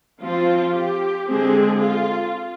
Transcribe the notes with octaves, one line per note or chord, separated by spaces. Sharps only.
F3 C4 F4
G4
D3 G#3 C4 G#4
F4